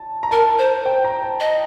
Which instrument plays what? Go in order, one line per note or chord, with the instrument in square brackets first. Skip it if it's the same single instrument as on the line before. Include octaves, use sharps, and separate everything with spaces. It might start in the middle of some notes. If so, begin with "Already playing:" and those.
Already playing: [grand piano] A5
A#5
[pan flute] A#4 [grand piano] A5
[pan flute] C5
[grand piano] G5
A#5
A5
[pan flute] D#5